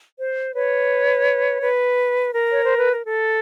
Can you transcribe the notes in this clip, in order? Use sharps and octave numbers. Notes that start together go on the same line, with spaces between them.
C5
B4 C#5
B4
A#4
C#5
C5
B4
A#4
A4